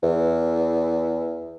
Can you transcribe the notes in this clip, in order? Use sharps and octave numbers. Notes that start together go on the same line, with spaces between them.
E2